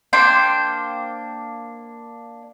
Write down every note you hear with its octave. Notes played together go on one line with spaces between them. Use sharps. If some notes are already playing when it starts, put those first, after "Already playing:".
A#3 D4 C5 G5